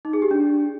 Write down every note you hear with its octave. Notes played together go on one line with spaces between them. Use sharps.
D#4
G#4
G4
D4